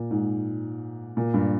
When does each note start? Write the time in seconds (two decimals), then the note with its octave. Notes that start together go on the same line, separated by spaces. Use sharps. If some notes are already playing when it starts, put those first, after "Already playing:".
Already playing: A#2
0.11 G#2
1.17 A#2
1.34 G2